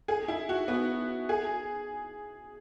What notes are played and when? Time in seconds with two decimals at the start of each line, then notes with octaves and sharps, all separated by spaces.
0.08 G#4
0.28 E4
0.49 F#4
0.68 B3
1.29 G#4